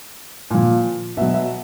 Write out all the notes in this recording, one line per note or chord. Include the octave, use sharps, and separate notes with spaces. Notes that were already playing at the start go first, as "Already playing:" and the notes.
A#2 F3
B2 F#3 E5
E5